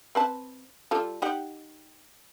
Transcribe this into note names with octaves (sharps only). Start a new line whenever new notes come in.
C4 B4 A5
G3 F4 A4
D#4 G4 F#5